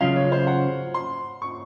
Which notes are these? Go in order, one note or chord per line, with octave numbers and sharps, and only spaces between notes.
C#3 F#3 C#4 F4 F5
C#5
C5
F#5
C6
C#6